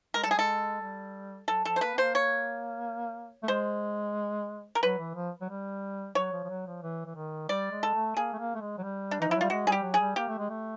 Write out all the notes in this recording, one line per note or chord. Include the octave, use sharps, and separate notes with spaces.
G#3 A#4
G3 A4
G#4
G#3 A4
G3
F#3 A4
F3 A4
C5
A#3 B4
B3
A#3 C5
C#5
A3
G#3 C5
A#4
F#3 B4
E3
F3
F#3
G3
F#3 C#5
F3
F3
F#3
F3
E3
E3
D#3
G3 D5
G#3
A4
A3
A#3 G#4
A3
A#3
A3
G#3
F#3
G3
D4
E3 D#4
F3
F#3 E4
G3 F4
G#3 F#4
G3 G#4
G4
F#3
G#4
G3
A#3 G4
A3
G#3
A3